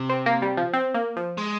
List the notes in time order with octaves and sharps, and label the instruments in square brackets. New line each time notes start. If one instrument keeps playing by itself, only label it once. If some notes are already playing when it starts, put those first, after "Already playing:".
Already playing: [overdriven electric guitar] C3
[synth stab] C4
A#3
G3
F3
C4
A#3
F3
[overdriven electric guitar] G#3